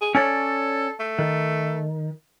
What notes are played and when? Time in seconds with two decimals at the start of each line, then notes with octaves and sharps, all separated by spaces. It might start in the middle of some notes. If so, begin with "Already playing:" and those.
0.01 G#4
0.15 C#4 A4 C#5 D5
1.00 A3
1.19 D#3